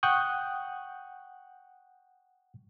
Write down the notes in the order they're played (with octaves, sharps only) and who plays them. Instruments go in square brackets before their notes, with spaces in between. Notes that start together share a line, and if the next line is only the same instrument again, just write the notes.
[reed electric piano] F#5 G5 C#6 D#6 F#6 G6